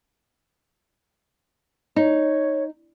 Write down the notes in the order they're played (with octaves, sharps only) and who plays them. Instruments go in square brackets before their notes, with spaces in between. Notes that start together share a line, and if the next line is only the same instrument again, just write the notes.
[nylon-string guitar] D#4 [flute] C#5